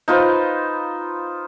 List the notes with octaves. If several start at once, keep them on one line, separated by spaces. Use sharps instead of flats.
D#4 F4 B4 C5